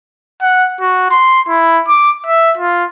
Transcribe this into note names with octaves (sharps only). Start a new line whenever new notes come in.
F#5
F#4
C6
E4
D6
E5
F4